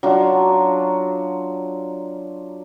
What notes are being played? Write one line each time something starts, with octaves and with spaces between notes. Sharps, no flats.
F#3 D4 F4